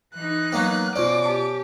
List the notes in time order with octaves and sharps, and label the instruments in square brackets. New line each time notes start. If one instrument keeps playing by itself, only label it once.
[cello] E3 D#4 [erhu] F#6
[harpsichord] F#3 A#3 B3
[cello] B2 [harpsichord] C#4 [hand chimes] F4 C5 D5 [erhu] D6
[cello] G4 [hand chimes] A5